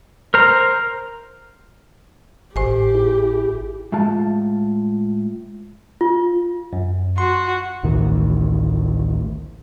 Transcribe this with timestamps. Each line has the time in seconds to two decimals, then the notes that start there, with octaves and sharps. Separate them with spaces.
0.34 A#4 C5 A#5 F6
2.56 G#1 A2 G4 C5 G#5
2.95 E4 G#4
3.92 A2 G#3 F4 A5
6.01 F4
6.73 F#2
7.18 F#4 C6
7.83 A1 D2 A2 D#3